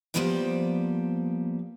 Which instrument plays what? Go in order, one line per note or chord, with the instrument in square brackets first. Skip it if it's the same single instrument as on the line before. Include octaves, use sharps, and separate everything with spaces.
[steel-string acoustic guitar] F3 G3 A#3 B3 C5 D5